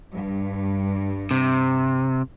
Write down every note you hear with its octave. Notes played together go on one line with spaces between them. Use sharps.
G2
C3